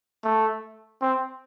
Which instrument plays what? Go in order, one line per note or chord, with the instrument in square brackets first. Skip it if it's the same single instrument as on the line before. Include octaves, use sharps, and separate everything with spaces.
[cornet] A3
C4